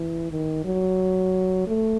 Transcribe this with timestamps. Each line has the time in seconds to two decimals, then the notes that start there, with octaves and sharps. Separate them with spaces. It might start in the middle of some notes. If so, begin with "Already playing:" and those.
Already playing: E3
0.31 D#3
0.64 F#3
1.68 A3